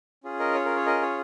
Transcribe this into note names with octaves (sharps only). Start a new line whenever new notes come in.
C#4 F4 G#4
A#4 D#5
C#5
A#4
C#5
A#4 D#5
C#5